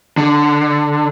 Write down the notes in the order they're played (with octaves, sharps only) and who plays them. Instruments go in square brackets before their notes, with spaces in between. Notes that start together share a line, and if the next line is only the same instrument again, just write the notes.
[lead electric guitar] D3